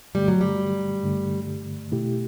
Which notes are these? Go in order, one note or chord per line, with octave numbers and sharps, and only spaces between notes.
G2 D3 G3 A3
F#3
G3
G2 D3 A3
B2 A3 E4 G4